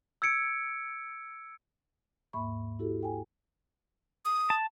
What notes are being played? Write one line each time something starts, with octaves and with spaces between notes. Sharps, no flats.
E6 G#6 C#7 D7
D#2 G#2 A#3 E5 B5 C#6
E4 F#4 G4 A4
A4 G5 G#5
D#6
A5